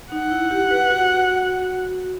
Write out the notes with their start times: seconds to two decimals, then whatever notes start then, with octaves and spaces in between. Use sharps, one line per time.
0.12 D#4 F#5
0.31 E4
0.51 G4
0.71 B4
0.90 F#4